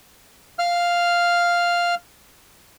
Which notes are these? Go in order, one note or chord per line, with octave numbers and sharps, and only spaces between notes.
F5 F6